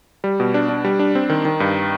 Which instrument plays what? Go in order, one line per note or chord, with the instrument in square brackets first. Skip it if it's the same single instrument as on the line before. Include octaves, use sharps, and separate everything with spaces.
[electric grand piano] G3
B2
D4
D4
G3
D4
C4
D#3
D#3
G2